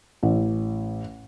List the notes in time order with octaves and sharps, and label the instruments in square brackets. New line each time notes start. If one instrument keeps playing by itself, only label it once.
[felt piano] A1